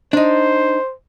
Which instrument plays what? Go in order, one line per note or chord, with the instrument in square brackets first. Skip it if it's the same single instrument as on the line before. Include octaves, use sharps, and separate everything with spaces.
[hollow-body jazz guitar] D4 D#4 [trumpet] C5